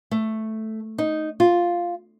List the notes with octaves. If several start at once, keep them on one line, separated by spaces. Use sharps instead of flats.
A3
D#4
F4